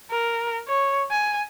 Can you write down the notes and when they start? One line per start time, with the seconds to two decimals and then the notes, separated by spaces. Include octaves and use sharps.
0.11 A#4
0.68 C#5
1.11 G#5